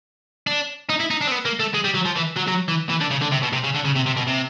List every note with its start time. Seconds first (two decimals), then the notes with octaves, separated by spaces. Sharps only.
0.47 D4
0.89 D#4
1.00 E4
1.11 D#4
1.21 D4
1.27 C4
1.32 B3
1.45 A#3
1.60 A3
1.74 G#3
1.84 G3
1.95 F#3
2.06 F3
2.16 E3
2.37 F#3
2.48 F#3
2.68 E3
2.89 E3
3.01 D3
3.11 C#3
3.22 D3
3.32 C3
3.43 B2
3.53 C3
3.64 C#3
3.75 D3
3.85 C#3
3.96 C3
4.06 C3
4.17 B2
4.27 C3